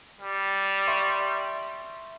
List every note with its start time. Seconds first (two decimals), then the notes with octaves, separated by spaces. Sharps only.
0.21 G3
0.88 E5 C6 C#6